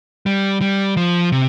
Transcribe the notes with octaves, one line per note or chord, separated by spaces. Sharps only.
G3
G3
F3
C3